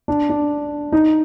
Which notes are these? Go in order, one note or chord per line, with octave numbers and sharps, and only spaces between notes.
D4
D4
D#4